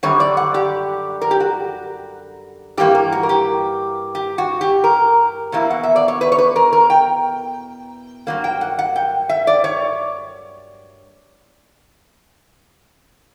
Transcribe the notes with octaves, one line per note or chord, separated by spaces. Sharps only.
F#2 D3 G3 C#5
D5
F#5
G4
A#4
G4
F#4
G2 E3 A#3 G4
A#4
F#4
A#4
G4
G4
F#4
G4
A#4
E2 B2 A#3 E4
F#5
E5
D5
C#5
B4
C#5
B4
A#4
A#4
G5
G2 F#3 A#3
G5
F#5
F#5
G5
E5
D5
C#5